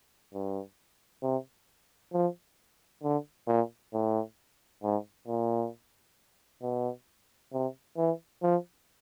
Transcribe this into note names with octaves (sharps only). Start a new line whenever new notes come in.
G2
C3
F3
D3
A#2
A2
G#2
A#2
B2
C3
E3
F3